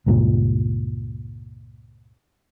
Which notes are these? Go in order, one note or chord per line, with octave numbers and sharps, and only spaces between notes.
C#2 G2 A#2